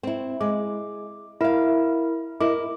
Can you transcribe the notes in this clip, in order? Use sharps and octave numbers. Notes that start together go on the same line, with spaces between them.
C4 E4
G#3 D6
E4 A#4 E5 F5
E4 A#4 D#5 D6